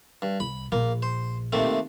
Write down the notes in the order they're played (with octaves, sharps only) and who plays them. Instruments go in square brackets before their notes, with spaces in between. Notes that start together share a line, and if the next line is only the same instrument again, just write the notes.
[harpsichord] G2
[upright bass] C2 [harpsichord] B5
[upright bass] A#1 [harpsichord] A#3
[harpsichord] C5
D#2 C3 A3